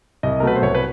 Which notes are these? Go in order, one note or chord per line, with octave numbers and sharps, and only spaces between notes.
C2 D#5
A#4
B2 F#3 A3 B4
C5
C2 C#5
B4